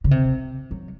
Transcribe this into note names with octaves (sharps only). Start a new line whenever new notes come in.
C#3
C3
F#3